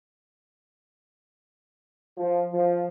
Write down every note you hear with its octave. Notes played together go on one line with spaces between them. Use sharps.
F3
F3